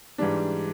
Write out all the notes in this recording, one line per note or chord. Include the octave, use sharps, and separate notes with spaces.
G#2 E3 G3 D4